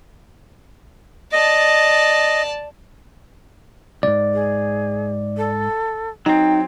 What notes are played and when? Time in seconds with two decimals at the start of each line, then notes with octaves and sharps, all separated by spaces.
1.32 D5 D#5 A5
4.03 C2 G#2 D5
4.34 G#4
5.37 A4
6.26 F#3 C4 D#4 G5